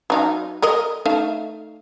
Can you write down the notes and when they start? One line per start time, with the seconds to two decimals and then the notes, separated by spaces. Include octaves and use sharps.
0.10 F#3 D#4 F5
0.62 A4 A#4 D#5
1.06 A3 D#4 F5